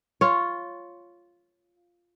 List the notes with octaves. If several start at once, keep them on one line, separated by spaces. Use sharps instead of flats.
F4 C#5